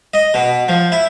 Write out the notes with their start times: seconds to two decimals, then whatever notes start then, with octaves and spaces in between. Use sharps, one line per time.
0.14 D#5
0.34 B2
0.68 F3
0.92 E4